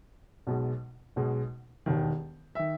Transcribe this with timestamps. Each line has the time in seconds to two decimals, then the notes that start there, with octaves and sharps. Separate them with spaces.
0.47 B1 B2 G#3
1.16 B1 B2 G#3
1.86 E1 D#2 D#3
2.55 D#3 E5